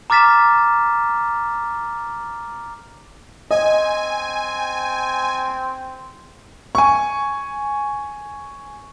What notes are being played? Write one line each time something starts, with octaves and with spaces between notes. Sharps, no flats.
A#5 D6 F6 A6 B6 E7
C4 D#5 G#5
G#5 C#6